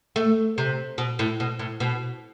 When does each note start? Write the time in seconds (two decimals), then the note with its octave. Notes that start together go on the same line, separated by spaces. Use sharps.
0.16 A3
0.58 C3
0.98 B2
1.19 A2
1.40 B2
1.59 A2
1.80 B2